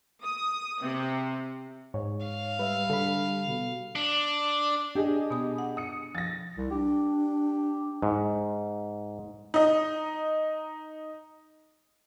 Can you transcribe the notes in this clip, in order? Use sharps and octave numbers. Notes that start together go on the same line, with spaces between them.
D#6
C3
G#2 C#5
F5
G3 B4 E5
D3 A4 B5
B2
D4
D4 G4 G#4 D#5
B2 B3 D#6
F#5
D#6 C#7
F3 A6 A#6
C2
D4 G4
G#2
D#4 D#5